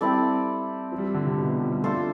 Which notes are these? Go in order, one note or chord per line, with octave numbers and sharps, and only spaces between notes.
G3 C4 E4 A4 D5
F3
G3
F3
D3
C3
B2
F3
G3
G3
A3 D4 F4 A4 C5